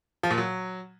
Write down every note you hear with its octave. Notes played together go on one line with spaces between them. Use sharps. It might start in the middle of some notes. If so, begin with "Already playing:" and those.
F3
A#2
F#3